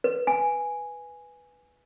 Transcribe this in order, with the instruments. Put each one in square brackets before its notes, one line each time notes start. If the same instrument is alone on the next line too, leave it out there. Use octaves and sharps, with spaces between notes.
[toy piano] B4
G#5